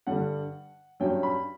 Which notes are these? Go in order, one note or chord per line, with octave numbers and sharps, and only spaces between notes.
G2 D3 G3 F#5
G2 F#3 C#4 G5
B5